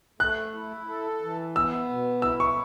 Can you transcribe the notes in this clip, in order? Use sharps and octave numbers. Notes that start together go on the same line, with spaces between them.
A3 F#6
E4
A4
E3
B3 E6
B2
E4 E6
C#6